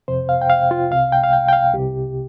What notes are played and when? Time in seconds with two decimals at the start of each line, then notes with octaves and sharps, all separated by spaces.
0.08 F2 C3 C5
0.29 F5
0.42 G5
0.50 F5
0.71 F4
0.91 C2 C3 F5
1.12 G5
1.24 F5
1.33 G5
1.48 G5
1.53 F5
1.74 C2 C3 G4